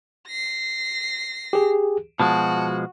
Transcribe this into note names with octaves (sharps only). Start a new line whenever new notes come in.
A#6 C7
G4 G#4
B2 F3 G#3 F#4 A5